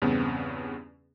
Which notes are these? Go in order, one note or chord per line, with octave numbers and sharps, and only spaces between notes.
E2 G2 C#3 B3 C4